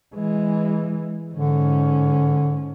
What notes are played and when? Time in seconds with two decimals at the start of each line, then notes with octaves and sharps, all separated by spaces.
0.15 E3 G#3
1.33 G#2 D3 C#4